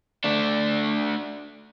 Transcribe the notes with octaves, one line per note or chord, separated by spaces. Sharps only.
A3 D4